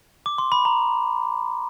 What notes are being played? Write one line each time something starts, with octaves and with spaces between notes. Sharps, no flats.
D6
C6
B5
A#5